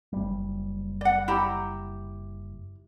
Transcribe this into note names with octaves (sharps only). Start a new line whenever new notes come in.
F#1 G3
D5 F#5
E4 G4 A#5